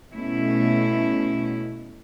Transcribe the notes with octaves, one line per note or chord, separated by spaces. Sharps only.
B2 A3 C#4 E4